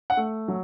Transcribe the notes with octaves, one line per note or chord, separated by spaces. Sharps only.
F#5
A3
F#3